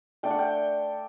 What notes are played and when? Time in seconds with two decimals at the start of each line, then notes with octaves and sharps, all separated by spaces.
0.23 A3 D4 G5
0.31 F#5
0.39 G5